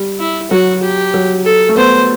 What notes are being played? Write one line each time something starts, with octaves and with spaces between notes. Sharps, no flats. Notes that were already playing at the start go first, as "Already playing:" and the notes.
Already playing: G3
E4
F#3 F#4
G4
F#3
A4
A3
B3 C5